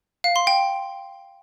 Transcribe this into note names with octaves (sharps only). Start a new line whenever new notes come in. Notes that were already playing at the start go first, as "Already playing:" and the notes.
F5
C6
G5